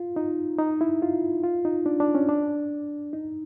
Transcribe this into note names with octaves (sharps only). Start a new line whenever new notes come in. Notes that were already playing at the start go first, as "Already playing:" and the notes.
Already playing: F4
D#4
D#4
E4
F4
F4
D#4
D4
D4
C#4
D4
D#4